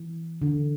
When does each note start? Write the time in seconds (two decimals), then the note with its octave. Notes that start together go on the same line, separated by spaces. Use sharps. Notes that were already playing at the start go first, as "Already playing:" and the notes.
Already playing: E3
0.41 D3